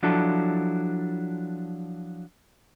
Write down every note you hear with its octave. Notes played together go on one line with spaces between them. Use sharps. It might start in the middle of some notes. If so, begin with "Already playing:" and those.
F3 F#3 D4 E4 A4